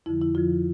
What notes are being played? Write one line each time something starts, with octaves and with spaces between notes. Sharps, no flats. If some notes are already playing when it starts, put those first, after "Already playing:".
F2 D3 F3 E4
E4
F2 D3 F3 F4